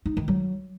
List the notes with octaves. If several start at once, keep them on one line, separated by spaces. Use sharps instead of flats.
D#4
D#3
F#3